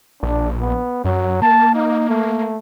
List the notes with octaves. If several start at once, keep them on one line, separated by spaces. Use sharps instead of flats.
A#1 D4
B3
F#2 F#3
A#3 A5
D#4
A3